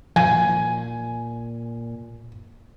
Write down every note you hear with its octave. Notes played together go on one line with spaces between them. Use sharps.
A#2 F3 G#5